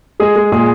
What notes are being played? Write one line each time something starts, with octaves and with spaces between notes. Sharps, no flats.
G#3 G#4
G#3
A#2 G#4